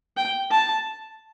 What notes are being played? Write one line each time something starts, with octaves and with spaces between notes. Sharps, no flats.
G5
A5